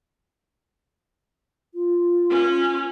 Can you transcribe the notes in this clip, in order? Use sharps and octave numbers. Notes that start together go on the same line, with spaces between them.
F4
C#4